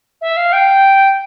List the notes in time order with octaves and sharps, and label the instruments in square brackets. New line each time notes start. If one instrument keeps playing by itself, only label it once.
[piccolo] E5
F5
G5